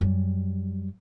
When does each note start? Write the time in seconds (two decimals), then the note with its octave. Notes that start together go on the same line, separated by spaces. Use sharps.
0.01 F#2 G3